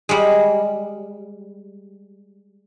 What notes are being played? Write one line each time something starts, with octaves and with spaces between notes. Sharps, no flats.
G3 G#3